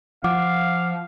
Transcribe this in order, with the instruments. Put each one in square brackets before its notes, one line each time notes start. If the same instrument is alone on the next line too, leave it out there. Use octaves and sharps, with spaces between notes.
[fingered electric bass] F3 [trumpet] F5 [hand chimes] F#5 D6